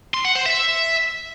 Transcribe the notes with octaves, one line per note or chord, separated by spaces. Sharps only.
C6
F#5
C5
E5